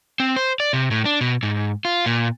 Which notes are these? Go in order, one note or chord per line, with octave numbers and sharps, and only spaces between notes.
C4
C5
D5
C3
A2
D4
B2
G#2
F4
A#2